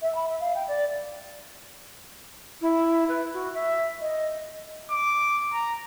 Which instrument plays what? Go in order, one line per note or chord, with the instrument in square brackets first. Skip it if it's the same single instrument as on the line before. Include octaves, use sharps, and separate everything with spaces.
[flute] E5
B5
E5
F5
G5
D5
[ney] E4
B4
F#4
E5
D#5
[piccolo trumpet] D6
A#5